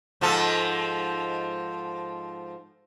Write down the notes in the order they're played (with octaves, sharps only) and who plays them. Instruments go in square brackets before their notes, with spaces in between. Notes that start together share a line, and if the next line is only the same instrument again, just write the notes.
[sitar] G#2 F3 A4